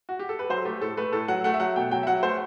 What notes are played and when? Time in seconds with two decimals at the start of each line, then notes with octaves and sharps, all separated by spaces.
0.09 F#4
0.19 G4
0.29 A4
0.39 B4
0.50 F#3 C5
0.65 A3 G4
0.81 A2 A4
0.97 A3 B4
1.12 A2 A4
1.28 F#3 F#5
1.44 A3 F#5
1.54 E5
1.60 F#3 F#5
1.76 B2 G5
1.91 F#3 G5
2.03 E5
2.07 F#3 F#5
2.23 A3 C5